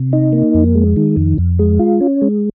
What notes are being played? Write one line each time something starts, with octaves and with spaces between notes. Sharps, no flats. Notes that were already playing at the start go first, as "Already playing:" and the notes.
Already playing: C3
D#4
A#3
F2
G#3
D#3
F2
F2
G#3
F4
C#4
G#3